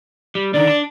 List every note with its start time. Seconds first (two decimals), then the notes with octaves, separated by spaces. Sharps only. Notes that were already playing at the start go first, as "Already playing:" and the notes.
0.35 G3
0.54 D3 D#3 D5
0.67 D4